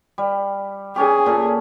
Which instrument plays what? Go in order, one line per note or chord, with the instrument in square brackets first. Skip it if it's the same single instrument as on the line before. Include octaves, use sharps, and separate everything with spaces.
[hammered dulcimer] G3
[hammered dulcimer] C#4 G4 [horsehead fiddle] G#4
[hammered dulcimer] A#2 A4